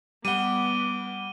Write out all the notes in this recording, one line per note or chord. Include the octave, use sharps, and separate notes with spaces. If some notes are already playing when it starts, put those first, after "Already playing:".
G3 B3 F#5 D6 D#7 G7